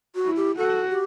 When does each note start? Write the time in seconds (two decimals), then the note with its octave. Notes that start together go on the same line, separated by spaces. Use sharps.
0.15 F#4
0.25 E4
0.36 G4
0.58 F#4 A4
0.90 G4